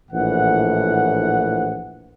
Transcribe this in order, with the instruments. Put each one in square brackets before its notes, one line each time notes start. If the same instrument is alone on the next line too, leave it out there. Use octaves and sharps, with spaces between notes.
[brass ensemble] A#1 A2 E3 F#5